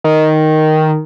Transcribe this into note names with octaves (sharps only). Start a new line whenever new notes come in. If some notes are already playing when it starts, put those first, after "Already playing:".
D#3